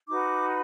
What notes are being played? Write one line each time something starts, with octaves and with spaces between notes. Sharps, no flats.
D#4 F#4 B4 D6